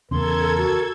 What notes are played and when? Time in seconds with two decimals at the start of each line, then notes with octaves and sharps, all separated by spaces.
0.11 E2 C#3 A4 A#4 C6 G#6
0.57 F#4